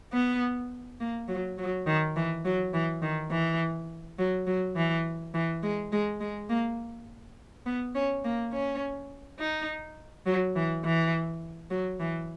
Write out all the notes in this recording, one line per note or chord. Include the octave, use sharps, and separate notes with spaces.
B3
A#3
F#3
F#3
D#3
E3
F#3
E3
D#3
E3
F#3
F#3
E3
E3
G#3
G#3
G#3
A#3
B3
C#4
A#3
C#4
D#4
F#3
E3
E3
F#3
E3